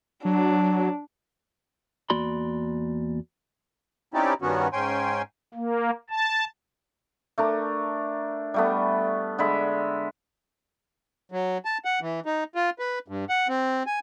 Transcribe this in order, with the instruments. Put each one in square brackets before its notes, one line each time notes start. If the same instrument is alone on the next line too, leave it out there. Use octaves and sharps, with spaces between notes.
[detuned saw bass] F#3 [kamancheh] D4
[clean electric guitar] E2 A#3 F#4 D5 B5 C6
[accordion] C4 C#4 D#4 E4 G4 D5
G2 D#3 B3 C#4 F#4
G#2 C#4 G5 G#5 C6
[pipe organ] A#3
A5
[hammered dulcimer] A3 D4 A#4
G3 A3 B3
D3 G#3 E5 B5
[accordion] F#3
A5
F#5
E3
D#4
F4
B4
G2
F#5
C4
G#5